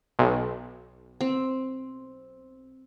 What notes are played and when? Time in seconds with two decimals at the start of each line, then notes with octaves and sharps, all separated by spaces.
0.19 B1
1.21 C4